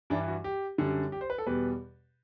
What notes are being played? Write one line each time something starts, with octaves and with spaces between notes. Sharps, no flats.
G2 E3 G3 D4
F#4
G4
F#2 D3 G3
G4
C5
B4
A4
E2 B2 G3 B4